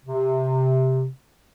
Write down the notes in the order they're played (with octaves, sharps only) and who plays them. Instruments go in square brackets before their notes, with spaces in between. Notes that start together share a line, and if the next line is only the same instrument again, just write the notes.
[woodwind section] C3